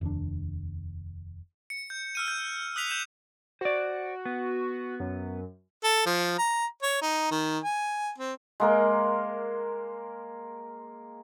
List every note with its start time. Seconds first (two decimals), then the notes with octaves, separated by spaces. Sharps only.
0.01 F1 D#2 D4
1.70 C#7
1.90 G6
2.15 E6 F6 D#7
2.28 G6
2.76 D#6 F#6 B6 F7
2.90 G6 E7
3.61 F#4 C5 D5
4.25 B3
5.00 F#2
5.84 A4
6.06 F3
6.38 A#5
6.83 C#5
7.02 D#4
7.31 D#3
7.64 G#5
8.18 C4
8.60 G#3 A#3 A#4